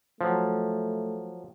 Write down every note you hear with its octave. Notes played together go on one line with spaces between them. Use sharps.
F3 F#3 A3